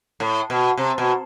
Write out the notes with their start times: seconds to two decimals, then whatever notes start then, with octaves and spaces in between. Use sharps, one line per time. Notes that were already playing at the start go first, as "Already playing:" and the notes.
0.20 A2
0.50 B2
0.78 C3
0.98 B2